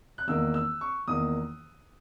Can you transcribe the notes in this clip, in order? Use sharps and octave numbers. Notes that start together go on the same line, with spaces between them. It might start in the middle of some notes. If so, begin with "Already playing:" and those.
F#6
E2 D#3 A#3 E6
E6
C#6
E2 D#3 A#3 D#6